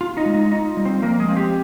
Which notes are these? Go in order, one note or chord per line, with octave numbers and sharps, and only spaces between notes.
F4
D#4 D#5
G#3
D#4 D#5
D#4 F4 D#5
G3
C4 C5
F3 A#3 A#4
G#3 G#4
C4
G4